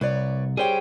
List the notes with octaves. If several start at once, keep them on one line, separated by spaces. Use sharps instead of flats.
C2 B4 C#5 D5
G3 G#4 C5 C#5 G5